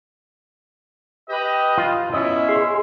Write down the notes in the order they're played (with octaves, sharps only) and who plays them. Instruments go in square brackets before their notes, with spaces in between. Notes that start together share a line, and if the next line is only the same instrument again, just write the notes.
[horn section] G4 B4 D#5
[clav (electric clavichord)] F4
[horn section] B2 C#4 E4 [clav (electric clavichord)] D#5
[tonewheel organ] G#4 C6